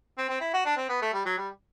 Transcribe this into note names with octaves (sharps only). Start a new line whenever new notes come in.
C4
C4
E4
F#4
D4
C4
B3
A3
G3
F#3
G3